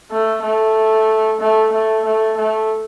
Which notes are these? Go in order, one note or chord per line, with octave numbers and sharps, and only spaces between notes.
A3
A3
A3
A3
A3
A3